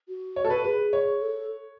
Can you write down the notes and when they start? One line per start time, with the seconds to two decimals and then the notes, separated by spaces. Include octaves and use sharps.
0.09 F#4
0.36 C#5
0.45 A4
0.50 B4
0.64 G#4 B4
0.93 C#5
1.21 A4